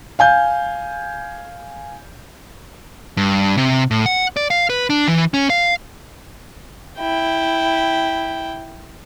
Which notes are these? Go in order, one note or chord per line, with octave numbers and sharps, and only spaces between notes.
F5 G#5 G6
G2
C3
A2
F#5
D5
F5
B4
D4
E3
C#4
F5
E4 G5